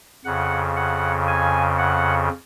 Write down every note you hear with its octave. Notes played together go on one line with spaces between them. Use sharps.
F2 C#3 F#5
F#5
G#5
F#5